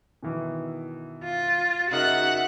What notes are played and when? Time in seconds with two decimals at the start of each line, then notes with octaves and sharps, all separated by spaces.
0.23 B2 D#3 E3
1.24 F4
1.91 C#3 D#4 F#4 A#4 E5 F#5 F#6